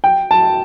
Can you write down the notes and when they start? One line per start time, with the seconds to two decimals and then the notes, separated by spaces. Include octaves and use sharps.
0.04 G5
0.31 A5